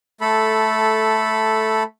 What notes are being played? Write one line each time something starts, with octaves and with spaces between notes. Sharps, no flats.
A3 A4 B5